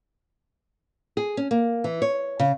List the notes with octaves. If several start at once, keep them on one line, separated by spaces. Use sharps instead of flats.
G#4
C#4
A#3
E3
C#5
C#3